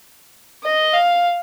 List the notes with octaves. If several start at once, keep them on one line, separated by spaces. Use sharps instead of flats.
D#5
F5